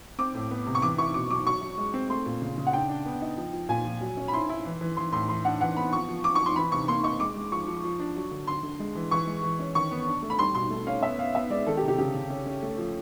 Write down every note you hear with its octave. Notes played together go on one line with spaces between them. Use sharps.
C4 D6
A2
B3
C3
C#6
E3 D6
E4 C#6
B2 D6
F#3 D6
F#3 C#6
F#3
G#3
C4
A3 C6
A#2
C#3
C#3
F#5
D4 G5
D4
B3
D#4
F3
F3
A#2 G#5
F3
F#3
C#4
B5
E4 C6
E4
E3
E3
E3 C6
A2 C6
E3 C6
D4 F#5
E3 F#5
B3 B5
F3 C#6
F3
F3 D6
C#6
F3
C6
E3 B5
C3 C#6
A#3 C6
D#4 C#6
G#3 D6
G#3
F3 C#6
F3
F3
D4
F#3
D3
D3 C6
D3
G#3
E3
E3 C#6
G#3
E3
C#4
D#3 C#6
B3
D4
A3
B5
G3 C6
B2 C6
A3
C#4 F5
B3 E5
B3 F5
B3 E5
G#3 D5
D#3 A4
G4
C3
G4
C#3 G4
C#3
C#4
C#4
A3
F3